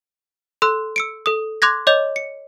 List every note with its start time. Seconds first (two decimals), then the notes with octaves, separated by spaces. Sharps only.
0.62 A4 C6 E6 F#6
0.96 E6 C#7 D7
1.26 A4 D#6
1.62 C6 D6 F#6 G#6 A#6
1.87 C#5 D#5 D6 G6 F7
2.16 C#7